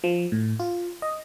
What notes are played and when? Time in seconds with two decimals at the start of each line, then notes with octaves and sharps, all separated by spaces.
0.04 F3
0.32 A2
0.60 F4
1.02 D#5